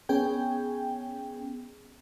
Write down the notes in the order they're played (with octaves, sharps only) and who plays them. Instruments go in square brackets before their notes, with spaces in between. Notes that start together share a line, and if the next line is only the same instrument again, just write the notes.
[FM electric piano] B3 C#4 G#4 G5